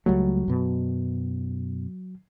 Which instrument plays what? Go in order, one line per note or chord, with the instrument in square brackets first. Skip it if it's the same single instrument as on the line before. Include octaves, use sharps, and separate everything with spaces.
[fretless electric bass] C#2 G3 A3 [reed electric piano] F#3
[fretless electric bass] F#2 B2